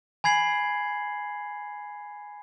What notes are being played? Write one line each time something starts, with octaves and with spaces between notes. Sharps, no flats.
G#5 B5 G#6 C7 F#7